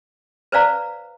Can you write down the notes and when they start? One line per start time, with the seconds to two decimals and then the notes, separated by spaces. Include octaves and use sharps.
0.52 B4 C5 D5 F5 A#5